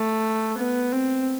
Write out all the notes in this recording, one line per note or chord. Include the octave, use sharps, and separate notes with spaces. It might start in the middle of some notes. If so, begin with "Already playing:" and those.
Already playing: A3
B3
C4